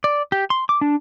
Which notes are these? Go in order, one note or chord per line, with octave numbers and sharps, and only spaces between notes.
D5
G4
C6
D6
D4